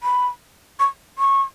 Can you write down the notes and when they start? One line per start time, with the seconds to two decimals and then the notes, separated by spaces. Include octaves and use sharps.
0.03 B5
0.80 C#6
1.19 C#6